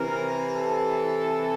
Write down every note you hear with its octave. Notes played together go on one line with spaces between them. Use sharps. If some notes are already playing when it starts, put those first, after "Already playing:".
Already playing: C3 E3 A#4
A4